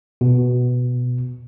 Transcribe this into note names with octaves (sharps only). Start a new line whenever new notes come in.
B2